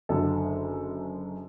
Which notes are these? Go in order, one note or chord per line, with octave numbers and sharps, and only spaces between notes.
F#1 F#2 D3 A4